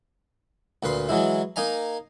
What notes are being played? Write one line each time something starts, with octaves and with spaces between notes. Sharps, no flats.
D2 A#2 B4 C6
E3 F#3 G#3 E4
A#3 D#4 D#5 G#5 A#5